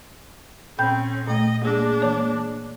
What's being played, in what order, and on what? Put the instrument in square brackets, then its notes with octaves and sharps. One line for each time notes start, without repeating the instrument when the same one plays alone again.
[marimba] A#2 G5 G6 [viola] C4 C#4 [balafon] B5
[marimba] A#2 A3 [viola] D#5
[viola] G#3 D4 [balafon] A#3 G#4
[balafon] E3 A#3 A5 [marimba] C#5